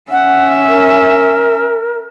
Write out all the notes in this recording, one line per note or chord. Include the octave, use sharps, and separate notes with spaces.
C#4 E5 F#5
A#4